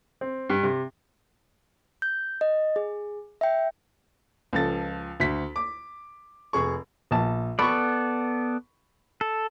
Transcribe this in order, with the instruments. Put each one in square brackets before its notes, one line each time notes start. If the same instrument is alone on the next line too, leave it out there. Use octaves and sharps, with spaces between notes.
[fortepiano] C4
G2
C3
[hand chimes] G6
D#5
G#4
E5 G5
[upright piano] C#2 F3 A4 A6
D2 B6
D6
F1 G#4 C#6
[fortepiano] A#1 A5
[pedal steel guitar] B3 A4 D5 [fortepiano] B5 C#6
[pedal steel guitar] A4